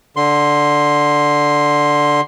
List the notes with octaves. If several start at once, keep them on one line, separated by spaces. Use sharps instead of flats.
D3 C6